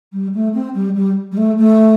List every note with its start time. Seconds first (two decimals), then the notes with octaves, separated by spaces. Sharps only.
0.12 G3
0.34 A3
0.54 C4
0.74 G3
0.95 G3
1.31 G3
1.37 A3
1.58 A3